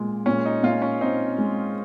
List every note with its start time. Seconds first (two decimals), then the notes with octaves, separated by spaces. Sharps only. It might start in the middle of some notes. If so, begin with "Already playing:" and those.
Already playing: A#2 G#3
0.26 A#2 C#4
0.46 D#4
0.63 A#2 F4
0.82 C#4
1.01 C4 D#4
1.38 G#3